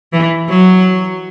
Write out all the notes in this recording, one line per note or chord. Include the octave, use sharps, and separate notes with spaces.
E3
F#3